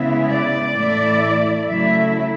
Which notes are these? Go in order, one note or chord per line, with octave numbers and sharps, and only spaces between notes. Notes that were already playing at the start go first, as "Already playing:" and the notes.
Already playing: C#3 G#3 B3 E4 E5
D5
A2 E3 A3 E4
C#3 F#3 A3 E4 E5